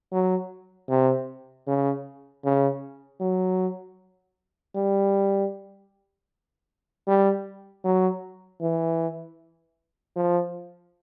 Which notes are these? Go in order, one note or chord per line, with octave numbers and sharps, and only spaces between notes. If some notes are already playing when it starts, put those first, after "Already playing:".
F#3
C3
C#3
C#3
F#3
G3
G3
F#3
E3
F3